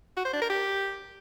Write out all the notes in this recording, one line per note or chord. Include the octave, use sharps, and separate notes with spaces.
F#4
C5
D4
A#4
G4